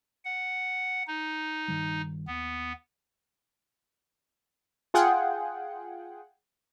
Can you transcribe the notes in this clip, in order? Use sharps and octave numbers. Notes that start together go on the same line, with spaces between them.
F#5
D#4
G2 D#3 G3
D#2 B3
F4 G#4 F#5 G5